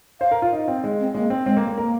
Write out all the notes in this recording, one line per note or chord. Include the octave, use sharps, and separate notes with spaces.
C5 F5
A#4
F4
D#4
C4
G#3
C4
G#3 A#3
C4
G#3 C4
A#3
A#3
A#3 A#4